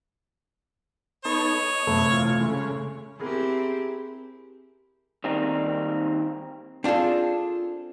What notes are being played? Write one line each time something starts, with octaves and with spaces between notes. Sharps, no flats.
B3 D#4 A4 C#5
D#5
F#2 C3 A3 B3 A4
C3 E3 F4
C#3 G#3
B3 C4 E4 G4 G#4 A#4
D#3 G3 A#3 C4 D#4
C4 D4 F4 G#4 A4